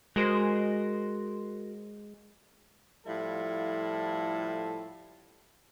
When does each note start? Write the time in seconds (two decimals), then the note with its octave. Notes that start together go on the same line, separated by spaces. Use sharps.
0.16 G#3 F#4 A#4 C5
3.05 A2 F3 G3 E4 F4 A4